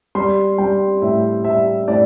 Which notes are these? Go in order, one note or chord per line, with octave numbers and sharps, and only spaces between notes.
G3 C6
G3 G5
A2 E5
G3 E5
A2 D5